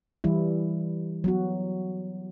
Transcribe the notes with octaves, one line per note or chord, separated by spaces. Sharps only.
E3 G3 E4
F#3 B3 F#4